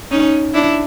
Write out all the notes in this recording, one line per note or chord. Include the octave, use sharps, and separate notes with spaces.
C#4 D#4
D4 E4